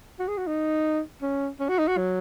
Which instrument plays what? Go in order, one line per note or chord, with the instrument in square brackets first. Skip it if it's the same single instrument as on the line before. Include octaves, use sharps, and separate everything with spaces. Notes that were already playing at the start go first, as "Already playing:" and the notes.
[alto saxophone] F#4
G#4
F#4
D#4
C#4
C#4
F#4
D#4
F#4
F#3